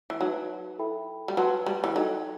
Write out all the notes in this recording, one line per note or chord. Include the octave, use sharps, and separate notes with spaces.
E3
F#3 D#4 F#4 B4 E5 A5
E4 A4 E5 G5 B5
G3
F#3 B4 F#5 A5 C6
G3
E3
F#3 D#4 A4 D#5